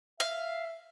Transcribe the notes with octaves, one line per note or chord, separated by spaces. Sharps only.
E5 F5